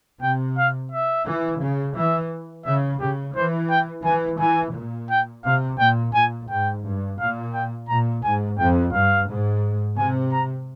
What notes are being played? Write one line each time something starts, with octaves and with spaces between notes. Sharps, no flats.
C3 G5
F5
E5
E3
C#3
E3 E5
C#3 E5
C#3 G4
E3 C5
G5
E3 G#5
E3 G#5
A#2
G5
C3 F5
A#2 G5
A#2 G#5
G#2 G5
G2
A#2 F5
G5
A#2 A#5
G#2 G#5
F2 G5
G2 F5
G#2
C3 G#5
A#5